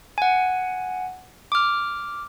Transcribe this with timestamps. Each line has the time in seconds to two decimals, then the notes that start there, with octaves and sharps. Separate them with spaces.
0.18 F#5 G#5
1.52 D6 F6